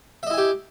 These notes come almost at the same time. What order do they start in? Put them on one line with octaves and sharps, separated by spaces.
E5 D#5 E4 G#5 G4